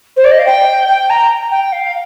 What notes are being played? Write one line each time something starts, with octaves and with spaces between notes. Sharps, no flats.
C5
D5
D#5
F5
G5
G5
A#5
G5
F5